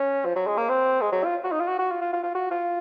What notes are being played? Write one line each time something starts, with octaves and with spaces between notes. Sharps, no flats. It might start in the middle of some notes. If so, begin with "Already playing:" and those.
Already playing: C#4
F3
F#3
G#3
A#3
C4
G#3
F#3
F4
F#4
D#4
F4
F#4
F#4
F4
F4
F4
F4
F#4
F4